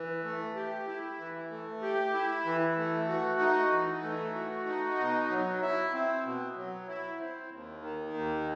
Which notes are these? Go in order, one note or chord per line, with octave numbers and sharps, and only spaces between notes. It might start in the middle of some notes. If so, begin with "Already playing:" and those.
Already playing: E3
A3
G4
E4
E3
A3
G4
E4
E3
A3
F#4
D#4
E3
A3
F#4
D#4
B2
F#3
E4
C4
B2
F#3
E4
C4
D#2
D#3
D#2